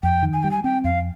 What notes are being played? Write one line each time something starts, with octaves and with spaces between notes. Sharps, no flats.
F2 G5
D#3
G#5
G3 G5
G#5
C4 G5
F2 F5